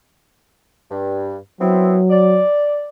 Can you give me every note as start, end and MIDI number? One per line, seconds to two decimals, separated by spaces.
0.91 1.36 43
1.61 2.42 54
1.61 1.98 59
1.61 1.98 60
1.61 1.98 64
2.10 2.89 74